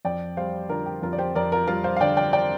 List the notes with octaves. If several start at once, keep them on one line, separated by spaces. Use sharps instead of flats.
F2 D5 G5
G3 C5 F5
D3 F4 A#4
G4
F2 F4 A#4
D5
G4 C5
F2 A#4 D5
F4 A#4
G3 F4 A#4
C5 F5
F5
D3 D5 G5
D5 G5
D5 G5